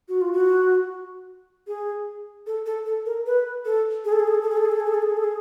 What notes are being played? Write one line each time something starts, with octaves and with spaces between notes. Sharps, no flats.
F#4
F4
F#4
G#4
A4
A4
A4
A#4
B4
A4
G#4
A4
G#4
A4
G#4
A4
G#4
A4
G#4
A4
G#4
A4
G#4
A4
G#4
A4
G#4